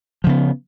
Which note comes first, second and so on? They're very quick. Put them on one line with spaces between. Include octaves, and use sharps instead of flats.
F3 C#3 B3